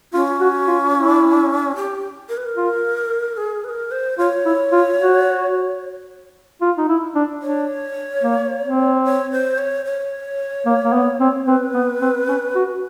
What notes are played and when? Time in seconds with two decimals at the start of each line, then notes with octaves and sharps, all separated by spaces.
0.14 C#4 F4
0.40 F#4
0.68 F4
0.94 E4
1.76 G4
2.29 A#4
2.37 B4
2.46 A#4
2.56 F4
3.37 G#4
3.64 B4
3.69 A#4
3.91 C5
4.18 F4 C#5
4.45 E4
4.72 F4
5.00 F#4
6.61 F4
6.77 D#4
6.89 E4
7.15 D4
7.42 D4 C#5
8.23 A#3
8.64 C4
9.04 C#5
9.32 C5
9.58 C#5
9.86 C#5
10.66 A#3
10.84 A#3
10.93 B3
11.20 C4
11.47 C4 B4
11.74 B3
12.01 C4
12.28 C#4
12.55 F#4